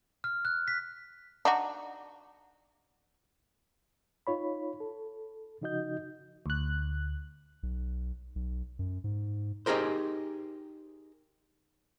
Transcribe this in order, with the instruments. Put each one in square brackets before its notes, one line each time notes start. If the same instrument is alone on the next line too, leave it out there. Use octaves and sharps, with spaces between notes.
[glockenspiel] F6
F#6
B6
[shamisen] D4 D#4 F#4
[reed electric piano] D#4 F4 C#5 B5
A4
C#3 F3 D#4 F#4 D#5 G6
[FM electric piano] D2 F#6
[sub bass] B1
B1
F#2
G#2
[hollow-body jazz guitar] D#4 G4 G#4 A#4 C5